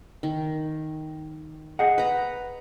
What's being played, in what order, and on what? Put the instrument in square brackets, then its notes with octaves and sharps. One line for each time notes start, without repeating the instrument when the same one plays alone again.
[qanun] D#3
[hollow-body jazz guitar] G#4 D#5 F#5
[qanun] B4 A#5